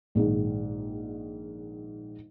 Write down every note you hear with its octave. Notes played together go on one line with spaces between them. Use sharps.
A#1 G#2 D#3